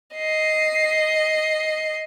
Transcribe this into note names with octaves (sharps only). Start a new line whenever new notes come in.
D#5 C7